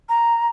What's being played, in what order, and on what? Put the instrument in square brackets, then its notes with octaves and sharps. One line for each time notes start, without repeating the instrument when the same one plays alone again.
[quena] A#5